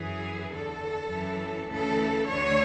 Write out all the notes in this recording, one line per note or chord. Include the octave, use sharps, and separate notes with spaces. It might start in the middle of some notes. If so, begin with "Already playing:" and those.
Already playing: F#2 E3 G#4
E2 D3 A4
F#2 E3
D2 C#3 E3 A4
D2 D3 C#5